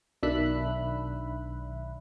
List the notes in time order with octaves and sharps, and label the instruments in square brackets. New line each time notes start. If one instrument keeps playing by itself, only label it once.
[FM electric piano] B1 D#3 D4 E5 B5 F#6